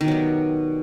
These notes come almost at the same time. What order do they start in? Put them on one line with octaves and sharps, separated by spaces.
D#3 B2 F#3 G3